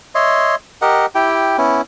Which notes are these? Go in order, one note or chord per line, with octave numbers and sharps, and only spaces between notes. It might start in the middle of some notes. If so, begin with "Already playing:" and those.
C#5 D#5 E5 C6
G4 A#4 D#5 F#5
E4 G4 G5
B3 C#4 E4